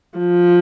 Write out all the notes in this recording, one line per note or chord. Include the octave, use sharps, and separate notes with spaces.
F3